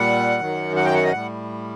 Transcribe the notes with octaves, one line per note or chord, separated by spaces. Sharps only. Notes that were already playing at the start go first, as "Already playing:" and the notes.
Already playing: A#2 G3 F#5
F#2 D#3 F#3
F#5
G5
F#5
D#5
A2 G3 F#5